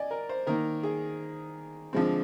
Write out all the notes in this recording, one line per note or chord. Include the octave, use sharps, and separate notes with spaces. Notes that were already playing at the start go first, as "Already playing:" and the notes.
Already playing: D5 D#5 G#5
A#4
C5
D#3 A#3 A#4
G#4
D3 F3 G#3 C4